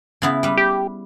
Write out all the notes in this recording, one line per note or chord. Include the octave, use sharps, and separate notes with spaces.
C#3 B3 E4
G3 B4
G4